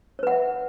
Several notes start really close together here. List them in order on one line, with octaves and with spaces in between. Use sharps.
C#5 B4 F#5 E5